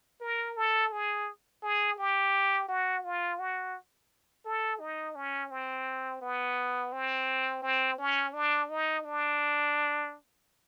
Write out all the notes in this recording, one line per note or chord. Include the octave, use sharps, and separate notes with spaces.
A#4
A4
G#4
G#4
G4
F#4
F4
F#4
A4
D#4
C#4
C4
B3
C4
C4
C#4
D4
D#4
D4